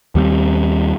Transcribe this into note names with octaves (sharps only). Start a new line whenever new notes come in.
D#2 G3 A3 C4